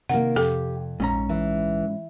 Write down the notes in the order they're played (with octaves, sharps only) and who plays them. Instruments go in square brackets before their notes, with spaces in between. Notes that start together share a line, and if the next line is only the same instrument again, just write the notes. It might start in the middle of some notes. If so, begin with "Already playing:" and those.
[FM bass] C3 [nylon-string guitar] D#3 A#3 [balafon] F#5
[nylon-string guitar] F2 [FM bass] C3 [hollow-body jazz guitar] G4 [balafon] A4
[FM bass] A#1 [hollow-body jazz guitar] G#2 C#4 A#5
[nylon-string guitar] E3